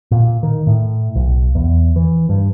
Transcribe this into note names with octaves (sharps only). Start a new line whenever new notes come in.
A#2
D#3
A2
B1
E2
E3
G2